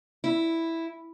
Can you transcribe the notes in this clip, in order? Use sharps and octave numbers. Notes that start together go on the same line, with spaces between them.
E4